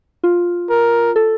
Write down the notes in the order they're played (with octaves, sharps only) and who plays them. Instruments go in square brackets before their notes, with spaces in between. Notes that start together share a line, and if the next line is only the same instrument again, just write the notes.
[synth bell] F4
[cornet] A#4
[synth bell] A4